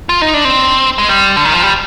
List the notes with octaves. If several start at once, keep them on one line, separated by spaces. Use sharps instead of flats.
F4
D#4
D4
C4
G#3
G3
D3
D#3
F3
G3